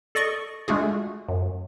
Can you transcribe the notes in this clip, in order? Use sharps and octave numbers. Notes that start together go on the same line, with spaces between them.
A4 D5 D#5 C#6
G#3 A3 D4 F4 F#4 G#4
F#2